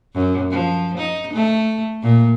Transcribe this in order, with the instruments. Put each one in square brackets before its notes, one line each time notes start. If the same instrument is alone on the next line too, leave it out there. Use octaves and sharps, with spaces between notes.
[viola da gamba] F#2
F3
D#4
A3
A#2